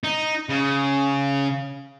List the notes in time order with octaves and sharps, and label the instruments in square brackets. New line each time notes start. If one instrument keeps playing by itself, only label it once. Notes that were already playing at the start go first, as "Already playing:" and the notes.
[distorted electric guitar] D#4
C#3